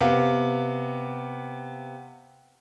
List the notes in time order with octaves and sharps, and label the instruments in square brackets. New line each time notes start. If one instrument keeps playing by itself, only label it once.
[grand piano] C3 B3 F5